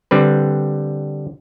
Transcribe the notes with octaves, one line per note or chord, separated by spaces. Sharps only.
D3 G3 C4 B4